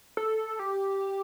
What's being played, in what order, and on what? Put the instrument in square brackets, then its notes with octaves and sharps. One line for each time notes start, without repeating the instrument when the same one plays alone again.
[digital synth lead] A4
G4